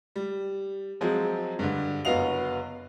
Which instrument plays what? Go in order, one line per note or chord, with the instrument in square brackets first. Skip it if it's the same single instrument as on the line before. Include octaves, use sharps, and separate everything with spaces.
[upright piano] G3
F3 F#3 G#3 C4
G2 D3
F#1 B3 F#4 D#5 F5 F7